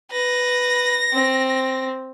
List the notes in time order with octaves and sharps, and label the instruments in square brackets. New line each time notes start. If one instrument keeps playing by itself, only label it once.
[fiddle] B4 [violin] A#6
[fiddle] C4